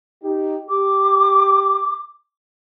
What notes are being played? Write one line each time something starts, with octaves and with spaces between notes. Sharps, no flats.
D#4 G4
G4 D6